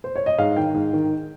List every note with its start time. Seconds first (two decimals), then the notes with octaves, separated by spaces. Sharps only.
0.04 C5
0.16 C#5
0.26 D#5
0.38 G#2 F5
0.57 D#3 G5
0.74 G#2
0.93 D#3